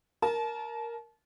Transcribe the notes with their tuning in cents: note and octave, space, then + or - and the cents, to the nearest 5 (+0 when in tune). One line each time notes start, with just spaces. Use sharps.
A#4 +0 A5 -30